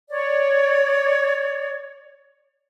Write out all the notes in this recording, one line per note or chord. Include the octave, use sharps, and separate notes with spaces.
C#5 D5